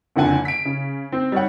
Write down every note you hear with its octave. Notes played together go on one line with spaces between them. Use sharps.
F#1 F2 D3 F#5 G#5 A5
B6 D7
C#3
C4
G3 D#4 C#5 F#5